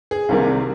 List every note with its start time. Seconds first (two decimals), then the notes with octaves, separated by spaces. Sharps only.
0.11 G#4
0.29 C2 C3 D#3 G3 A#3